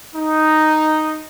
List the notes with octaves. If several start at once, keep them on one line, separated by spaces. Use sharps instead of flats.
D#4